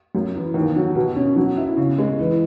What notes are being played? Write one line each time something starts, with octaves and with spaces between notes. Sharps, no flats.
F#2
E3
D#2
F#3
B2
C#4
F#3
E4
C#3
G#3
E3